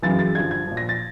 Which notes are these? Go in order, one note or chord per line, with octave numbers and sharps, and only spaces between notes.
F#2 C#3 E3 A6
A6
G2 D3 F3 G#6
G#6
A#2 F3
A#6
A6